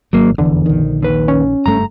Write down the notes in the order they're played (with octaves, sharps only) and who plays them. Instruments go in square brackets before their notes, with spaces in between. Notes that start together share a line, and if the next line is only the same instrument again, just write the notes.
[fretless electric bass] G#1 [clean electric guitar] F#3 A#3
[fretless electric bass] F1 [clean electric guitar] E2 [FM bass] D3
[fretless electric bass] A#1 D#3
[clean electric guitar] D#2 B4
[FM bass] C#4
[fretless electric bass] F#1 G2 A3 [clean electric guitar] A#5